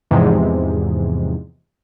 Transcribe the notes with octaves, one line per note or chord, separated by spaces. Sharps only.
E2 G#2 C3 F3 G#3